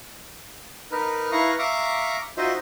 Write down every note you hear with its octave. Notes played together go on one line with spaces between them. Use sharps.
D#4 A#4 B4
E4 B4 F5 A#5 C#6
E5 F5 A#5 C#6 D6
D#4 F4 F#4 C5 D#5 E5